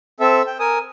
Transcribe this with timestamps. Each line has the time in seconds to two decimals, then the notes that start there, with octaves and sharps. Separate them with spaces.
0.20 C4 A4 E5
0.47 G5
0.60 A#4 G#5 D#6